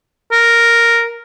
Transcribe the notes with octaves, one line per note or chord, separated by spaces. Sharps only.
A#4